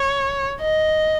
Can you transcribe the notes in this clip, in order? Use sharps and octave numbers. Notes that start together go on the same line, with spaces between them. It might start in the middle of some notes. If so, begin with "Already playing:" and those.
Already playing: C#5
D#5